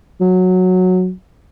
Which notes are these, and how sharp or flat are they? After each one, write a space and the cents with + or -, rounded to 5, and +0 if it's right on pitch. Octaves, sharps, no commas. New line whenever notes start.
F#3 -10